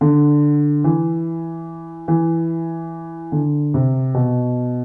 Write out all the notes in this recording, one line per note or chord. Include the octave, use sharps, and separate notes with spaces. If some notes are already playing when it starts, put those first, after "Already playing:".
D3
E3
E3
D3
C3
B2